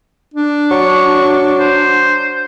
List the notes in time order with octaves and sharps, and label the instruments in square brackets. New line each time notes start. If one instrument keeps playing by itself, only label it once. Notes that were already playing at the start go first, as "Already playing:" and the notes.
[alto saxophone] D4
[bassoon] F#3 [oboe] C#6
[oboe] C5